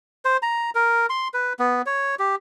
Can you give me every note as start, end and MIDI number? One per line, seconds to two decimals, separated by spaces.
0.25 0.37 72
0.42 0.70 82
0.75 1.06 70
1.10 1.28 84
1.34 1.53 71
1.59 1.82 59
1.86 2.15 73
2.19 2.36 67